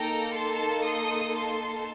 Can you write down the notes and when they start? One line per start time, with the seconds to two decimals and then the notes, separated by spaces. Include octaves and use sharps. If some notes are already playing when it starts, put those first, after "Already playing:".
Already playing: A#3 D#4 A4 G5 A#5
0.34 A5 C6
0.85 C6 D#6
1.34 A5 C6